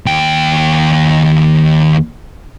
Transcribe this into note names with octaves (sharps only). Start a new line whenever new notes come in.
D#2 G5